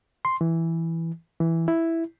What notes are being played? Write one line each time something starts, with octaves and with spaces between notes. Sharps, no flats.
C6
E3
E3
E4